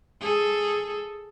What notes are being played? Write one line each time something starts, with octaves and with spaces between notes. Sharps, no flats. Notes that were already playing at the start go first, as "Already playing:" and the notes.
G#4 A4